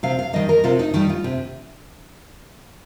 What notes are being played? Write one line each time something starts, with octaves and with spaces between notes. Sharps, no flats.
C3 F5
F5
D#3 G3 D#5
A#4
C3 F4
D#4
D#3 G3 D#4
F4
C3